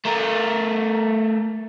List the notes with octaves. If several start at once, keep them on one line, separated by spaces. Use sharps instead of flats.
A3 A#4